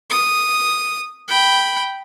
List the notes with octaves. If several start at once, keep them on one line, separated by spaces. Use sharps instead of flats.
D#6
G5 B5